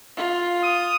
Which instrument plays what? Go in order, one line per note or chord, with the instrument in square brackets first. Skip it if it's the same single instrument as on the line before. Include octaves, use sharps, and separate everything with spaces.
[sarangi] F4
[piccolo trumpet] D#6